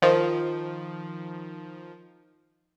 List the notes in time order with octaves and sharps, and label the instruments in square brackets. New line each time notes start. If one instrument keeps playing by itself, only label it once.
[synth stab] D#3 F3